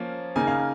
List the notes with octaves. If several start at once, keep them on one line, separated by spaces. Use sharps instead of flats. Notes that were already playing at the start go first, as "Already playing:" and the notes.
Already playing: F3 A#3 C#4
C#3 A#3 D#4 G#5
F5